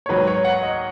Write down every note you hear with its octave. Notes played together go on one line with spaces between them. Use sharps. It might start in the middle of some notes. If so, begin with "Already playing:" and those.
C#5
G#2 D#3 F#3 B4
C#5
F#5
D#5